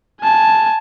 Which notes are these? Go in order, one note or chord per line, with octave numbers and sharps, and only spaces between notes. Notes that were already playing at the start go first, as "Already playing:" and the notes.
G#5 A5